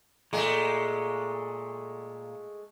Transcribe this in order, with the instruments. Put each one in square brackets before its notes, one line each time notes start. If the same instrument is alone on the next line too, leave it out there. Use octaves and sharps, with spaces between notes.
[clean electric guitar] A#2 [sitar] G#3 A3